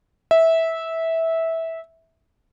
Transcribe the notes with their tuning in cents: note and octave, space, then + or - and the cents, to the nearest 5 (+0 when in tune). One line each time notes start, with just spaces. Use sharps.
E5 -15